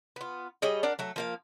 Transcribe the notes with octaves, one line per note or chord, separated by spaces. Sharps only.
B3 F4
G3 G#4 C#5 D#5
D4 A#4 D5 F#5
F#3 A3
F3 A#3 F5